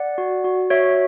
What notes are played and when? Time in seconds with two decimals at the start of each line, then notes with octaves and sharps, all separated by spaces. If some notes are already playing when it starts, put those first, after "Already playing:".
Already playing: D5 F#5
0.18 F#4
0.44 F#4
0.70 F#4 C#5 E5